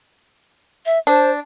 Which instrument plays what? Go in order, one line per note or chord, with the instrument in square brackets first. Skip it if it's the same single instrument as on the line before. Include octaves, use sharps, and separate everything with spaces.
[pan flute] E5
[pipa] D4 [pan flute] C5